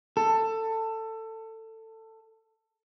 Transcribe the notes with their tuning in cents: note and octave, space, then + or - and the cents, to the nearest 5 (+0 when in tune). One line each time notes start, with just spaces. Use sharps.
A4 +20